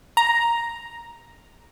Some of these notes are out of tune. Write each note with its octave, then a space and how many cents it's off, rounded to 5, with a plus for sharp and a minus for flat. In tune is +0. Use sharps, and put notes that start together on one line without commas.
A#5 +5